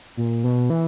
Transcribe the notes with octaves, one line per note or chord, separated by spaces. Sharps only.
A#2
B2
E3